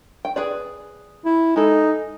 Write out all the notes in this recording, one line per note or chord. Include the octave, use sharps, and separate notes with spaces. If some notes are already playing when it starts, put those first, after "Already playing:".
G5
G#4 B4 D5
E4
G#3 D#4 A4